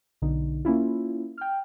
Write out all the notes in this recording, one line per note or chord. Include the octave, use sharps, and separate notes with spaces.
B1 D3 D#4
A#3 C#4 E4 F4
G5 F6